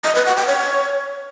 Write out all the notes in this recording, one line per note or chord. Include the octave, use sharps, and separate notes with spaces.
D#5
B4
F#5
G5
C#5